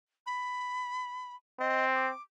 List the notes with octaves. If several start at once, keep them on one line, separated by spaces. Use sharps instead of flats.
B5
C4 D#5
D6